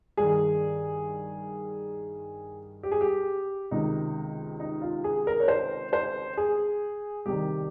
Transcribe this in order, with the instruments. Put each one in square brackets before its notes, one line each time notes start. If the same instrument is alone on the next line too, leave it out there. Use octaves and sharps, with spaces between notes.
[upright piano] G2 D#3 G#4
G4
G#4
G4
C#2 C3 D#3 D#4
D#4
F4
G#4
A#4
C#5
C5
C5
G#4
C2 C3 D#3 G4